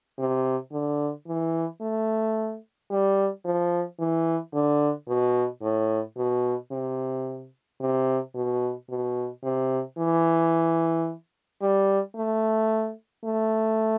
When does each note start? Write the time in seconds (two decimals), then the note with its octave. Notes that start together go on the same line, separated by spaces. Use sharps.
0.18 C3
0.72 D3
1.27 E3
1.81 A3
2.91 G3
3.45 F3
3.99 E3
4.54 D3
5.08 B2
5.62 A2
6.17 B2
6.71 C3
7.81 C3
8.35 B2
8.90 B2
9.43 C3
9.98 E3
11.61 G3
12.16 A3
13.24 A3